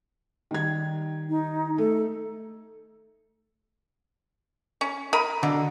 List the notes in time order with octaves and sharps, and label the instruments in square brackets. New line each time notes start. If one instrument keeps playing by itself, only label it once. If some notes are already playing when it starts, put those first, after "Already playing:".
[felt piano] D#3 G3 G#6
[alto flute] D#4
[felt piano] A3 [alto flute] A4
[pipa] C#4
A#4 D#5 B5
[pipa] B2 [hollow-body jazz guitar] D3